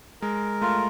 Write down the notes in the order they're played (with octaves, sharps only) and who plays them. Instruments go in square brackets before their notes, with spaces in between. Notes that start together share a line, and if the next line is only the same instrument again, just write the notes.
[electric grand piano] G#3 [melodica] A#4
[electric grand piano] A3 [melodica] F4